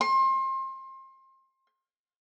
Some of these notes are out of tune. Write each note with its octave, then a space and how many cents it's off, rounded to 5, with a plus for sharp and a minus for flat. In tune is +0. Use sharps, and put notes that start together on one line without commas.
C6 +30